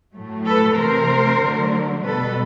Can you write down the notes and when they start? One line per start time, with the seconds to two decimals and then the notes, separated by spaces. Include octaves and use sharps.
0.14 A2 F#3 A3
0.46 A4 B4
0.77 C3 E3 A3 A#4 C5
1.41 D3 F#3 A3
2.05 B2 G3 A4 B4